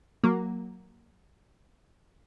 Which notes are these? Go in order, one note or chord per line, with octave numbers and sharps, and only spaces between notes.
F#3 A#3